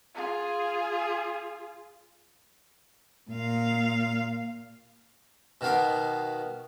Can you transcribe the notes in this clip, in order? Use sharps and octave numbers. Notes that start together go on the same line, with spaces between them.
F4 G#4
A#2 F5
B2 D#3 B3 F5 D6